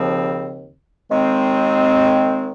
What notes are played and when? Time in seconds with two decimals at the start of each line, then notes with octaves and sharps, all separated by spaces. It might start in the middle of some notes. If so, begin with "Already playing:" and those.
Already playing: D#2 C#3 F3 C4
1.09 D#2 D#3 G#3 C4